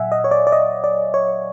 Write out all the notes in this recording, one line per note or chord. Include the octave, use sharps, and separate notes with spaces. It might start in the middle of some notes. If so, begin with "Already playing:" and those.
Already playing: A#2 F#3 E5 F#5 G#5
D#5
C#5
D5
D5
D#5
D5
C#5